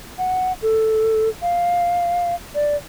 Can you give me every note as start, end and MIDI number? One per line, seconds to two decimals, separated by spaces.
0.18 0.52 78
0.63 1.29 69
1.42 2.35 77
2.55 2.76 74